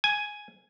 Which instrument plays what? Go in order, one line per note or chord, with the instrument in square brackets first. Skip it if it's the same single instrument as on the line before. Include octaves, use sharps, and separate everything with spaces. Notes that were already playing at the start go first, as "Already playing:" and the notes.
[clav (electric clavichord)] G#5